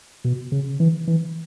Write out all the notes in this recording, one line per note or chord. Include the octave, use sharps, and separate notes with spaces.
B2
C#3
E3
E3